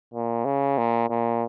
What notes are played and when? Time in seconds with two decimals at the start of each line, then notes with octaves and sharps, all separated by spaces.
0.14 A#2
0.45 C#3
0.78 A#2
1.10 A#2